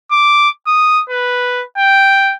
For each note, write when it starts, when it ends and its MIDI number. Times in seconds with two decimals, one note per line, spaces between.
0.11 0.49 86
0.67 1.03 87
1.09 1.63 71
1.78 2.34 79